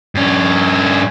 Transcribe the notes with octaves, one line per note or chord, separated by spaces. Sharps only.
G2 C#4